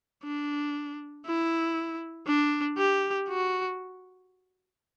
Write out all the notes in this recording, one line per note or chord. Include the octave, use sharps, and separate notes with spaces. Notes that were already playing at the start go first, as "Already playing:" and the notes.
D4
E4
D4
G4
F#4